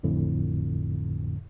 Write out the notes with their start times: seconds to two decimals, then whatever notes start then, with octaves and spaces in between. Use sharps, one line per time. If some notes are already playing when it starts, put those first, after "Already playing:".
0.03 A1 F2 A2 D3